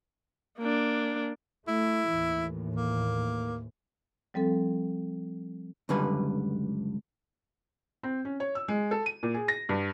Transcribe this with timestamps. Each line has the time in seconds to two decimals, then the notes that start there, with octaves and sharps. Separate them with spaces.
0.58 A#3 D4
1.67 A3 E4
2.11 D#2 A2 E3
2.76 A#3
4.34 F3 G3 C4 A4
5.89 C#2 F#2 D3 G3 B4 G#5
8.03 C4
8.25 C#4
8.40 C#5
8.55 E6
8.68 G#3
8.91 A4
9.06 D#7
9.23 A#2
9.34 G#4
9.48 A#6
9.69 G2